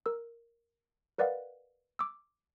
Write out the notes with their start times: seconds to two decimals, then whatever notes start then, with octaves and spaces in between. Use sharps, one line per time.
0.06 A#4 E6
1.18 A#4 B4 D5 D#5 F5 F#5
1.99 D6 E6